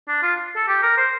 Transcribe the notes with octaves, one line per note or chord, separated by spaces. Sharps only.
D4
F4
A4
G4
A#4
C5